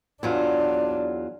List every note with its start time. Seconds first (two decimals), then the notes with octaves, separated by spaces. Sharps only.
0.23 E2 F#3 D4 F4